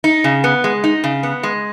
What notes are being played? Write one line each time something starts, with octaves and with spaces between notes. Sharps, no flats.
D#4
C#3
B3
G#3
D#4
C#3
B3
G#3